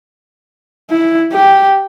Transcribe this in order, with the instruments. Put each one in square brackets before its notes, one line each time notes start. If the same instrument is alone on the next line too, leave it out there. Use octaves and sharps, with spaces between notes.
[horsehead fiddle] E4
G4